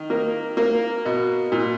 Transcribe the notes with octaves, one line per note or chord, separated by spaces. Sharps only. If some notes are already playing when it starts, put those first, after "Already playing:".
Already playing: D#3
A#3
A#3
B2
A#2